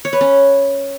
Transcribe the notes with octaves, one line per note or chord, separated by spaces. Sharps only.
C#5
B4
C#4